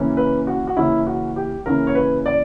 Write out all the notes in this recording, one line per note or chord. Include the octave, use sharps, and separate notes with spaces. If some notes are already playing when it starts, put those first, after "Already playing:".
Already playing: C#3 E3 A#3 C#4
B4
F#4
F#4
C#3 E3 A#3 C#4 E4
F#4
G4
C#3 E3 A#3 C#4 A#4
C#5
B4
D5